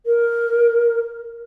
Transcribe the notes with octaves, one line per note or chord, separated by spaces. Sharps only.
A#4